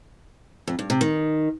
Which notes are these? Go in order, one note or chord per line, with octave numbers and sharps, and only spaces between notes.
F2
G2
C3
D#3